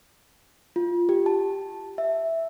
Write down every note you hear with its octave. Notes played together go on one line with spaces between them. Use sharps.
F4
G4
A5
E5